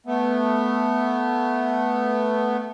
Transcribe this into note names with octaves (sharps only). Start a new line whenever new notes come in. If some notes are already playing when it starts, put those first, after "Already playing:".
A3 B3